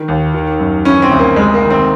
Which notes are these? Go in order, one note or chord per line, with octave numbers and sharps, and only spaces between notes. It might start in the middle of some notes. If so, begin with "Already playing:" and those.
Already playing: D#3
D#2
D#3
F#2
E3 C#4
C4
D2
A#3
F1 G#3
A#3
D#3
C4